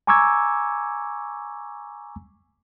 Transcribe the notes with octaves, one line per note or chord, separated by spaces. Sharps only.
G#5 A#5 C#6 D6 E6 G#6